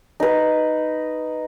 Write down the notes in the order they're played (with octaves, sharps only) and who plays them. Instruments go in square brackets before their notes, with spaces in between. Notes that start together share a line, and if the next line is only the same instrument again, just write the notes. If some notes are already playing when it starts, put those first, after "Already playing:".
[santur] D#4 B4